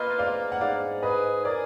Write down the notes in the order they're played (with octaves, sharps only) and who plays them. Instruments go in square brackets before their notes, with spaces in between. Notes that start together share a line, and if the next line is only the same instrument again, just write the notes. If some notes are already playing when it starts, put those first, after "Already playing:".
Already playing: [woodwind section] A#3 F4 [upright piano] B4 D#5
[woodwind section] G#2 [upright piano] D5 F5
[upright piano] F#5
[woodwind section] G#2 [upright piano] D5 F5
[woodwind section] G#4 [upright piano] B4 D#5
[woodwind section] G#4 [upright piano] A#4 D5